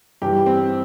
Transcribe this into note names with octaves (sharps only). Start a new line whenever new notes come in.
G2 E3 G4
C4